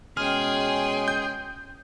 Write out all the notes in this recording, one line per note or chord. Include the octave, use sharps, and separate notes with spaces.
B2 G#3 C#4 G#4 G5 C6 F6
G6